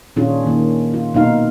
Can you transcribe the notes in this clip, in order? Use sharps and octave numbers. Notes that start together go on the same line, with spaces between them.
A#2 D#3 C#4 D4 F4 G#4
D#3 A#3
F4
B2 A#3 D#4 F5